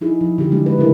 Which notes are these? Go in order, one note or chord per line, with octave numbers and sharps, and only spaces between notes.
F3 D#4 E4 G#4
F3
D3 G4
D3 F#3 G#3 D4
B4
C#3 A3 D4 E4 A#4